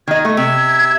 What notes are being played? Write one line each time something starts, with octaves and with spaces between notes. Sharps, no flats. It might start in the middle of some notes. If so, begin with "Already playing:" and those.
D#3 D#5 G#6
A3
C3 E5